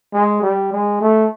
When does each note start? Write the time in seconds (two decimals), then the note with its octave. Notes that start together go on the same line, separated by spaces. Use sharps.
0.13 G#3
0.42 G3
0.72 G#3
1.01 A3